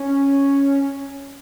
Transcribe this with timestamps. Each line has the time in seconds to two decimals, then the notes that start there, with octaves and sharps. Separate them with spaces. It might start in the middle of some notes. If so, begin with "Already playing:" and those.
Already playing: C#4